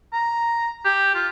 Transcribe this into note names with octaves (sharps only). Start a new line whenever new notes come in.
A#5
G4
F4